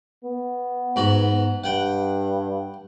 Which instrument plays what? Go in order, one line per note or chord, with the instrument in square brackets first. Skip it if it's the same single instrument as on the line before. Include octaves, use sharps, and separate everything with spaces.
[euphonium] B3
[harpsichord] G#2 F#4
[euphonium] G2 [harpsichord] F#5 G5